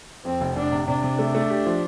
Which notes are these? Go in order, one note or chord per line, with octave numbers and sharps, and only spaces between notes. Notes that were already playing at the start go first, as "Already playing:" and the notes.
F2 C4
F1
F1 D4
C3
C3 D4
C3
A3
A3
G4
F3